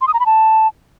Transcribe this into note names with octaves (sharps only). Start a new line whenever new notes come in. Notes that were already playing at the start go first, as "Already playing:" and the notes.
C6
D#6
A#5
B5
A5